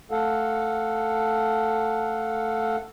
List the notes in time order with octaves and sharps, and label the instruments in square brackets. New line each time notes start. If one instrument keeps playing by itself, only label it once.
[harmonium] A3 A4 F5 F#5